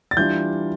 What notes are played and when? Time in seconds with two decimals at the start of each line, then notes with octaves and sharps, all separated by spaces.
0.11 A6
0.17 E3 G3 D4 F4 G6